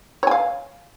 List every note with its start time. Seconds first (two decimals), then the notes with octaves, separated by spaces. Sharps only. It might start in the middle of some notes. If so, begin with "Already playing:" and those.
0.23 C#5
0.27 G#5
0.31 F5